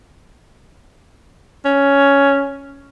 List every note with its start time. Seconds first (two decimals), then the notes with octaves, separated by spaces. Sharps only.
1.65 C#4